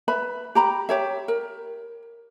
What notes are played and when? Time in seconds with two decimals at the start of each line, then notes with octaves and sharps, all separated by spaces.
0.08 B4 E5 B5
0.55 G4 A#5 B5
0.89 G4 C#5 E5
1.28 A#4